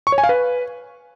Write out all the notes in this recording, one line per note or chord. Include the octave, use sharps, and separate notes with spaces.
C#6
C#5
G#5
F5
B4